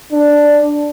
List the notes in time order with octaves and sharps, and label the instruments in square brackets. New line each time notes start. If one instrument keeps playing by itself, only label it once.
[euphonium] D4